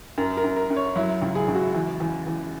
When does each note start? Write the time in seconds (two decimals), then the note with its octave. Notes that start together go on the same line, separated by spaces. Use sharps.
0.18 F#2 A#4
0.37 A#4
0.44 F#2
0.56 A#4
0.70 F#2
0.76 C#5
0.96 F#3 E4
1.22 C#2
1.35 G#4
1.48 C#2
1.55 F#4
1.74 E2
2.00 E2
2.27 E2